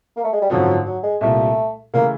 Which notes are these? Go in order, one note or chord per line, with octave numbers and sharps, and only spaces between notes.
A#3
A3
G#3
G3
G#1 F#2 D3 F3 F#3
F#3
G#3
C2 A#2 G3 A3
C#3 E3 A3 A#3